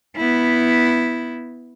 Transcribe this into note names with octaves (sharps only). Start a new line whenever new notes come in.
B3 E4